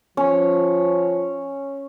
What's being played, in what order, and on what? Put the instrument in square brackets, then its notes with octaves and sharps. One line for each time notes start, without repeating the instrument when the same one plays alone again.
[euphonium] F3 [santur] C#4